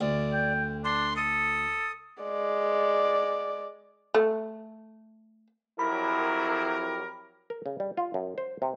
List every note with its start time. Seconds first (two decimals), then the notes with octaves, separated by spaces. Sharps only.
0.01 D2 D5
0.33 G5
0.84 D4 C6
1.16 A4 D#6
2.23 G#3 D5
4.14 A3
5.79 F2 F#3 E4 G4 A#4 B5
7.50 A#4
7.66 C#3
7.80 G3
7.97 F4
8.14 F#2
8.38 C5
8.62 C3